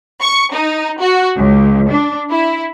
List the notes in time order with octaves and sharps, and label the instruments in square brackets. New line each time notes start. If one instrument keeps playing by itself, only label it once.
[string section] C#6
D#4
F#4
C#2
D4
E4